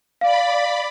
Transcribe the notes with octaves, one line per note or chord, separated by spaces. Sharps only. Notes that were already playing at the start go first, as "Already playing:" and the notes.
D5 F5 B5